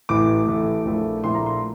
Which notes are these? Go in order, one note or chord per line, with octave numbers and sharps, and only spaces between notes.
A1 A2 E3 A3 D6
A1 A2 E3 A3
A#1 A#2 A3 E4
A#1 A#2 A3 E4 C6
A#5
C6